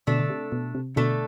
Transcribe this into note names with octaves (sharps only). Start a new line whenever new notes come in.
B2 D3 A3 D4 A4
D3
C3
B2
C3
B2 D3 A3 D4 A4